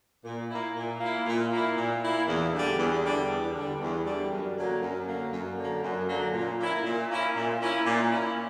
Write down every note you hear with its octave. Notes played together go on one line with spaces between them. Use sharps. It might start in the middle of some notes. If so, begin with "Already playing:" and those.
A#2
A#3 E4
A#2
A#3 E4
A#2
A#3 E4
A#2
E4
A#3
E2
D3 G3
E2
D3 G3
E2
D3 G3
E2
D3 G3
F#2
D3 F#3 A#3
F#2
D3 F#3 A#3
F#2
D3 F#3 A#3
F#2
D3 F#3 A#3
A#2
A#3 C#4 E4
A#2
A#3 C#4 E4
A#2
A#3 C#4 E4
A#2
A#3 C#4 E4